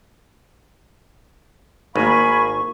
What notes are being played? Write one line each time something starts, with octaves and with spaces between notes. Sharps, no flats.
G#1 A#3 D#4 F5 G#5 B5 C#6